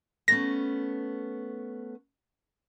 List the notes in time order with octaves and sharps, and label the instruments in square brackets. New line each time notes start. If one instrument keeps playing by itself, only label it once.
[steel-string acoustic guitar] A3 B3 C#4 [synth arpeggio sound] A#6